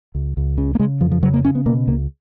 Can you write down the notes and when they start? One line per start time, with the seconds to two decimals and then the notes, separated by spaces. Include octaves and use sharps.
0.15 C#2
0.37 C#2
0.58 C#3
0.75 A#3
0.79 C#3 G#3
1.01 F2 F3
1.12 F3
1.23 C#3 F#3
1.34 A#3
1.45 C#3 C#4
1.55 B3
1.66 B2 A#3
1.87 C#2 A#3